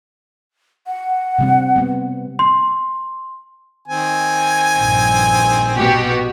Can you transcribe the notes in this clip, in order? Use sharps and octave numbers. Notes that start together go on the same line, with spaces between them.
F#5
C3 G3 C4
G3 B3
C6
D#3 C4 G#5
A#1 G2
B2 F#4 G4